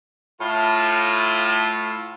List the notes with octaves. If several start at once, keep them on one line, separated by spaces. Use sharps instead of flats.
A2 F4